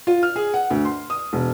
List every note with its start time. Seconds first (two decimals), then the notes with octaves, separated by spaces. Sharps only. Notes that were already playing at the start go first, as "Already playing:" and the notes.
0.07 F4
0.23 F6
0.36 G#4
0.54 F#5
0.70 D2
0.85 C6
1.10 D#6
1.33 E1